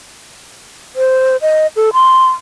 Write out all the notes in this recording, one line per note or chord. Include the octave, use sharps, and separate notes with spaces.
C5
D#5
A4
C6